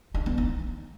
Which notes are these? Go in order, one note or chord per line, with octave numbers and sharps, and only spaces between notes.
D4
B3
D#4